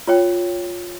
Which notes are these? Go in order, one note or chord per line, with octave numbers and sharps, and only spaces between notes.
F4 C#5 G5